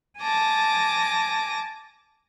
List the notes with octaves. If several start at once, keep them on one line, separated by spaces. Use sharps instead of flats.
G#5 A5 D6 A#6